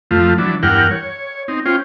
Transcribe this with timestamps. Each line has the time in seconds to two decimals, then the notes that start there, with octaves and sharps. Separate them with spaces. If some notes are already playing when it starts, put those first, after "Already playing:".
0.11 F2 F3 A3
0.38 E3 F#3 D4
0.63 E2 G2 A#4 F#5 G5 F6
0.91 C#5
1.48 C4 D#4
1.66 C#4 F4 C5 G5